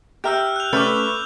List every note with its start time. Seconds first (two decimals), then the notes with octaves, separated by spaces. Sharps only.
0.24 G4 E5 A#5 E6 F6 G6
0.56 F#6 F7
0.73 A3 C#4 B4 D6 F6 G6